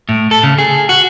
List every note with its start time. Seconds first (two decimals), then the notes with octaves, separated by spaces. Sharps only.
0.09 A2
0.31 A4
0.43 C#3
0.59 G#4
0.89 F#4